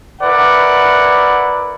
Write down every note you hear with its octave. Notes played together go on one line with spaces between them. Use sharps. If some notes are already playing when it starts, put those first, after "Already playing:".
E4 A#4 B4 D5 F#5